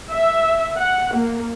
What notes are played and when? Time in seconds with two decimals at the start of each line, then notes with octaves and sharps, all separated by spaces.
0.11 E5
0.75 F#5
1.15 A#3